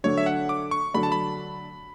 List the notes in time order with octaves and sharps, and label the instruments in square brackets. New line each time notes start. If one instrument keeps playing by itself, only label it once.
[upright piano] D3 F#3 A3 D4 [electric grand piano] C#5
[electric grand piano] E5
F#5
D6
C#6
[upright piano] D3 F#3 A3 D4 [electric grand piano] B5
[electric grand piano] A5
B5